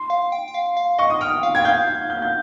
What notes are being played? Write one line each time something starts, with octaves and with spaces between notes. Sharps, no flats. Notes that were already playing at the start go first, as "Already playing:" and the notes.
Already playing: C6
F5
G5
G5
F5
F5
D#5 C#6
D#6
G5 F6
F5
G5 G#6
F5 G6
G#6
G6
G6